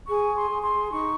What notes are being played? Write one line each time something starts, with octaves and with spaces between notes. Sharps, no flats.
G#4 C#6
C6
G#4
C6
D#4 C#6